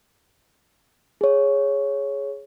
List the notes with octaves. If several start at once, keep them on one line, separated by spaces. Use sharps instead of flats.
G#4 C#5